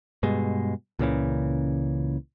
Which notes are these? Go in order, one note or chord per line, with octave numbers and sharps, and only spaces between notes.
G2 B2 G#3
C#2 A#2 C#3 E3